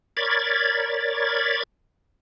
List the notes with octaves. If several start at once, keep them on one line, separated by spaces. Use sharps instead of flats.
A#4 C#5 D5 B5 G#6 A6